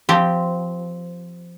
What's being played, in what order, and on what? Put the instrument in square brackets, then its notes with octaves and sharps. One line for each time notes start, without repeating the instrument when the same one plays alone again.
[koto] F3 C4 G4